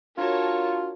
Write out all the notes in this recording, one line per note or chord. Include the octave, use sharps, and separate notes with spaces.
D4 F4 F#4 A#4 C#5 A5